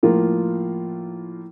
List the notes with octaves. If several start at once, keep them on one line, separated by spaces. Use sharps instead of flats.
A2 F3 A#3 F4 A#4